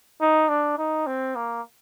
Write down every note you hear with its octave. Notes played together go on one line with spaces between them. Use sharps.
D#4
D4
D#4
C4
A#3